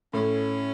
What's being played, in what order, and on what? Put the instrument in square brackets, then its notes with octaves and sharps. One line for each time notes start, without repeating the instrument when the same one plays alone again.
[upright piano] A2 [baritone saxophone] C#4